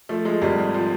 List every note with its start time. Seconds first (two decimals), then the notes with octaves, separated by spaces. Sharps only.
0.09 F3 A3
0.25 F3 G#3
0.42 G#1 G3
0.58 G#2
0.74 F3